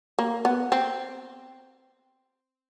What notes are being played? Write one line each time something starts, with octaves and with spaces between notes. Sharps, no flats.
A#3
B3
C4